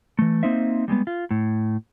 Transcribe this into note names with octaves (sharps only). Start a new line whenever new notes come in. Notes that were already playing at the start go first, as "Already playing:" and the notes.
E3 A3
A#3 C4 D#4 C5 E5
G3 G#3 A#3 B3
F4
A2